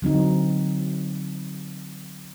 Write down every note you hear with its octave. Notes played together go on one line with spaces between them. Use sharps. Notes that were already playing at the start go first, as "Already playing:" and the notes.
D3 F#3 C4 D#4